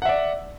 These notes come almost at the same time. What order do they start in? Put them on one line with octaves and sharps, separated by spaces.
F#5 E5 D5